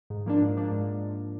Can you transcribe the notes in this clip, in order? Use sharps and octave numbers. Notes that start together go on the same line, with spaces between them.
G#2
F3 A#3 D4
G#2
F3 A#3 D4
G#2